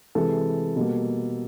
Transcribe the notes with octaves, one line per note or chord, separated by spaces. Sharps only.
C3 E3 G#3 A4
B2 G3 A#3